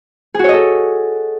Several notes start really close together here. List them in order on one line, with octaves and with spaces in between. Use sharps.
G#4 F#4 C#5 D#5 A4